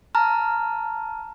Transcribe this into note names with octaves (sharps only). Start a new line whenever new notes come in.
A5 A#5 F6